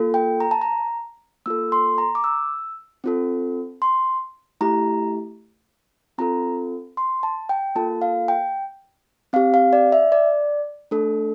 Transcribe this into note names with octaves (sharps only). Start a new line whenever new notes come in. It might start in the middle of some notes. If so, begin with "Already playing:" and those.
Already playing: A#3 F4 A4
G5
A#5
A5
A#5
A#3 F4 A4 E6
C6
A#5
D6
E6
C4 F4 A4
C6
A3 E4 G4 A#5
C4 F4 A4 A#5
C6
A5
G5
A#3 F4 A4 A5
F5
G5
C4 G4 F5
F5
D5
E5
D5
A3 D4 A4